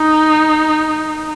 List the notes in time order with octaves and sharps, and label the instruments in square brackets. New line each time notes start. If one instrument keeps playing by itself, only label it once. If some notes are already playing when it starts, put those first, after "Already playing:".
Already playing: [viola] D#4